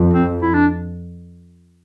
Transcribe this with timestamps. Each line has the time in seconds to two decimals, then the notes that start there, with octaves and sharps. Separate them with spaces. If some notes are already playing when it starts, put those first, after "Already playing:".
Already playing: F2
0.13 C4
0.42 E4
0.54 D4